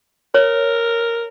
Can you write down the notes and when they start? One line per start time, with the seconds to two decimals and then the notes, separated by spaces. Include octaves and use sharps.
0.34 A#4 C#5